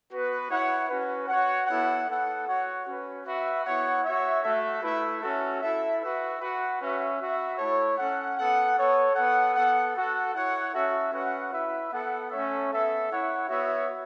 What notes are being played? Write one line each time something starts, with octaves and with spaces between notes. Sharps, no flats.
B3 F#4 B4
E4 C#5 F#5
C#4 F#4 B4
F#4 C#5 F#5
B3 E4 A4 C#5 F#5
B3 A4 F#5
F#4 C#5 F#5
C#4 F#4 B4
F#4 B4 E5
B3 E4 C#5 F#5
F#4 C#5 E5
A3 F#4 A4 E5
A3 E4 B4 E5
C#4 F#4 A4 E5
E4 A4 E5
F#4 B4 E5
F#4 B4 F#5
C#4 F#4 B4 E5
F#4 B4 E5
A3 E4 A4 C#5
C#4 A4 F#5
B3 A4 F#5
B3 A4 C#5
B3 A4 F#5
B3 A4 F#5
F#4 A4 F#5
E4 C#5 F#5
C#4 F#4 A4 E5
C#4 F#4 B4 F#5
E4 B4 E5
B3 A4 F#5
A3 C#4 A4 C#5 E5
B3 A4 E5
E4 C#5 F#5
B3 F#4 C#5 E5